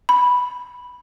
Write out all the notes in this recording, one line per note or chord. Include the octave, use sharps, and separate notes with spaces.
B5